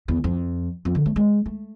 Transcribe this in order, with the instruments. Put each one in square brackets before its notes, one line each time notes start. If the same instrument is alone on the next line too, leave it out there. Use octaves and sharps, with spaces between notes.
[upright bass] E2
F2
F2
D3
A3
G#3
A3